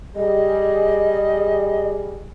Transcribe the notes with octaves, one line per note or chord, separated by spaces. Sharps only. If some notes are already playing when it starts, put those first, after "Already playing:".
G3 G#4 D#5